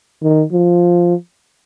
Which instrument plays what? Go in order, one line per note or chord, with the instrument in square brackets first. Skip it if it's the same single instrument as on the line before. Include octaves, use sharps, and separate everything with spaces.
[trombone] D#3
F3